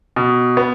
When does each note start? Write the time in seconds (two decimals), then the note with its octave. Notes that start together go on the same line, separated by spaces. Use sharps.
0.16 B2
0.57 B3